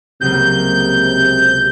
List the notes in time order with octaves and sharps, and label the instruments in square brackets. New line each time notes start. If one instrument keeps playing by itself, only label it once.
[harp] C#2 F#3 A#3 [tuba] C3 [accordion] G6